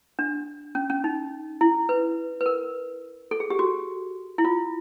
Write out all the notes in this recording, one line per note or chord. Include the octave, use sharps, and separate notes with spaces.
D4
C#4
C#4
D#4
E4
B4
B4
A#4
A4
G#4
G4
F#4
E4
F4